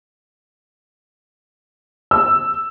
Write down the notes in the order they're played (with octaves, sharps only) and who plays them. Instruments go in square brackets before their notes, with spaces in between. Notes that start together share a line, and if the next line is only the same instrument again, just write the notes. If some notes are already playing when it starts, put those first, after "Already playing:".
[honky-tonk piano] E6